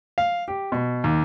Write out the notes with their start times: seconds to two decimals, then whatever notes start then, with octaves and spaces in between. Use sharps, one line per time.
0.18 F5
0.48 G4
0.72 B2
1.04 D#2